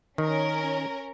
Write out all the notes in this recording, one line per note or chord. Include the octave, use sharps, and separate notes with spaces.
D#3 C#4 A#4